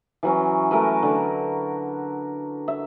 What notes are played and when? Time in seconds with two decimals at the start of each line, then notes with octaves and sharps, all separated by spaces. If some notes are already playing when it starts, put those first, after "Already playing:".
0.23 E3 F#3 C#4
0.71 A3 A#4 B4
1.03 D3 A4 A#4
2.68 E5